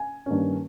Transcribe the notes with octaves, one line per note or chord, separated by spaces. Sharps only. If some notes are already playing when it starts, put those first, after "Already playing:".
Already playing: G#5
G2 D#3 A#3 C#4